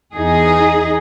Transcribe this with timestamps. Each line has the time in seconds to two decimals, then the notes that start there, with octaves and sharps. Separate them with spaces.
0.14 E2 D#4 G#4